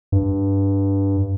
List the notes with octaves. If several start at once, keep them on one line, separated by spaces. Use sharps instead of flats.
G2